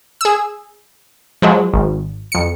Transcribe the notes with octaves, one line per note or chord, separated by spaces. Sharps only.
G#4 E6
F3 F#3 G#3
G#1
F2 C#7